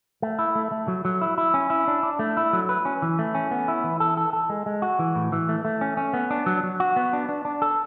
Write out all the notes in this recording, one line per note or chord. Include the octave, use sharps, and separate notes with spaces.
A3
E4
A3
A3
F#3
F#3
E4
E4
C#4
E4
D4
D4
A3
E4
F#3
B4
C#4
E3
A3
C#4
B3
E4
E3
A4
A4
A4
G#3
G#3
F#4
E3
A2
E3
A3
A3
C#4
C#4
B3
D4
F#3
F#3
F#4
B3
D4
D4
D4
A4